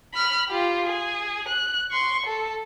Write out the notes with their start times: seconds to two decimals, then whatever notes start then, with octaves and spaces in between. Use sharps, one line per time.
0.14 B5 F6
0.49 F4 G4
0.86 G#4
1.48 F#6
1.91 C6 C#6
2.26 A4